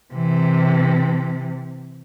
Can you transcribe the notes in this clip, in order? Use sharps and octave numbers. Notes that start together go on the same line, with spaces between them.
C3 E3